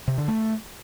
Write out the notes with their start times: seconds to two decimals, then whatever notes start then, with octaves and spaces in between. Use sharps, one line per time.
0.08 C3
0.18 D3
0.28 A3